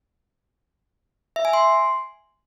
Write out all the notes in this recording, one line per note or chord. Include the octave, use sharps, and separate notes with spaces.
E5
G#5
C6